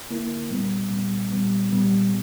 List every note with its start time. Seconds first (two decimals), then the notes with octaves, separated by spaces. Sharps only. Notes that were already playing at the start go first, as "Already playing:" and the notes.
0.10 D3 A#3 E4 A#4
0.51 A#2 G3 B3
0.91 A#2 G3 B3
1.32 A#2 G3 B3
1.72 A#2 G3 B3